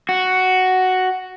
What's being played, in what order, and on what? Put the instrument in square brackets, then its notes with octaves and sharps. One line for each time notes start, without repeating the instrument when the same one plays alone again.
[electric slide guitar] F#4